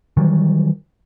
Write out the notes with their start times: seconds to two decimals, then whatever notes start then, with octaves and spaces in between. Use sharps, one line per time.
0.17 D#3 E3 F#3 G3